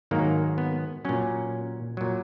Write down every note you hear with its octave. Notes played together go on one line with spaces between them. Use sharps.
G#2 D#3 F#3 A#3
B3
A#2 F#3 C#4
A#2 F#3